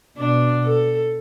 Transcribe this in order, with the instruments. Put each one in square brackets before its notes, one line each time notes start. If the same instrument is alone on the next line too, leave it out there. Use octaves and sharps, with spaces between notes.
[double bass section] B2 [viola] D4
[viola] A4